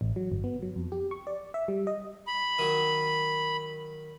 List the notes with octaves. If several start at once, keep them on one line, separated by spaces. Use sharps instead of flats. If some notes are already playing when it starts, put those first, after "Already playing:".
A1
F#3
G1
B3
F#3
F2
G4
C#6
D5
E5
G3
D#5
B5
D#3 F#3